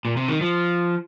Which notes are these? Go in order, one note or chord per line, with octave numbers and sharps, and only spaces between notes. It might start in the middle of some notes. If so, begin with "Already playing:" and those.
A#2
C3
D#3
F3